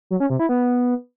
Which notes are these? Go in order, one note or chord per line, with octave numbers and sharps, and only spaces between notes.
F#3
C#4
C3
E4
B3